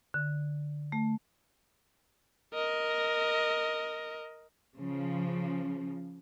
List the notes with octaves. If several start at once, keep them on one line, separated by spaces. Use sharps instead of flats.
D3
A3
A#4 D#5
C#3 F3